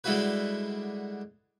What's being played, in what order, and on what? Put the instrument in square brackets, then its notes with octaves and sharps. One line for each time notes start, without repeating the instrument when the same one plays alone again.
[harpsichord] D3 G3 G#3 E4 F#4 B4